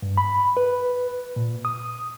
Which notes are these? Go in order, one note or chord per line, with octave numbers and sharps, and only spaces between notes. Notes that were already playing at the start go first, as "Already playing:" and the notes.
G2
B5
B4
A#2
D#6